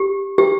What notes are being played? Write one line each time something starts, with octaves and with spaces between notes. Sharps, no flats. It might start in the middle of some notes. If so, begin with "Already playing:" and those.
Already playing: G4
G4